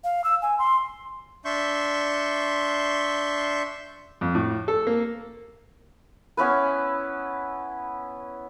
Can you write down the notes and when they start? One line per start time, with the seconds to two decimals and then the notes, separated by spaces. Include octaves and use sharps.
0.04 F5
0.24 E6
0.42 G#5
0.59 C6
1.45 D4 E5 C6 C#6 G6
4.21 F2
4.35 A2
4.68 A4
4.87 A#3
6.37 B3 C#4 E4 B4